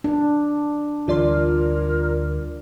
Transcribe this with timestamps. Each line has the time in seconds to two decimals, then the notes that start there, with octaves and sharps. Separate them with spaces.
0.04 D4
1.08 D2 E3 G3 F4 A#4 D5 C6